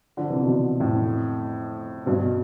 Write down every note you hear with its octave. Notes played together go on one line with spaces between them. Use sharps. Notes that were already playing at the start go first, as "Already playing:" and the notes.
D3 F3
C3 E3
B2 D3
F2 A2
G2 B2
B2